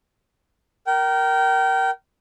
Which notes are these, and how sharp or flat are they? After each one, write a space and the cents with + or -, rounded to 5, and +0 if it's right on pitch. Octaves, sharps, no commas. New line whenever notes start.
A#4 +0 G5 -30